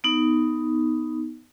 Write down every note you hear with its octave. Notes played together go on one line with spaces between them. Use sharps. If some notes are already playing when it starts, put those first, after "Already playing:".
B3 D#4